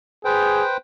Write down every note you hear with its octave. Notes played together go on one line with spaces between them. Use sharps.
G#4 B4 C5 G5